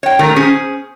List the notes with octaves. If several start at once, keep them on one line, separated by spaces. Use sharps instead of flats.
C#5 G5
A#2 D#3 A3 A#4 A#5
C#4 G#4 C5